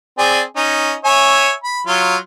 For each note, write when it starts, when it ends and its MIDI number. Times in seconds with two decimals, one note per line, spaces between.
0.18 0.41 60
0.18 0.41 68
0.18 0.41 74
0.56 0.94 61
0.56 0.94 63
1.05 1.51 73
1.05 1.51 76
1.05 1.51 80
1.63 1.81 83
1.87 2.16 54
1.87 2.16 65